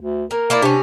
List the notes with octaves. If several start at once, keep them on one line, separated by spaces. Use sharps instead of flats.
D2
A#3 A#4
A#3 E4 D5
C3 C#4 D4